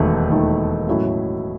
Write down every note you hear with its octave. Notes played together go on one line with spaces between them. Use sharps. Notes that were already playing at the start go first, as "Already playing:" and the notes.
Already playing: E1 D#2 D#3 A3
E1 D#2 D#3 A3
A2 F#3 C#4 E4